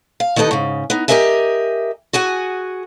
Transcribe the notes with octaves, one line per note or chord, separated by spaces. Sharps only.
F5
D#3 B3 G4 A4 D#5
G#2 C#3
B3 D#4
G4 G#4 A#4 D#5 E5 G#5
F#4 G#4 F#5 G#5